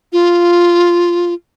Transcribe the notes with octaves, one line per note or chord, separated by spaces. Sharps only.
F4